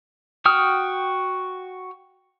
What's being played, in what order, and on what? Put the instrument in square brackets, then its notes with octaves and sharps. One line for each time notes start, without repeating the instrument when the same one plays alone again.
[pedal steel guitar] F#4 G5 D#6 F6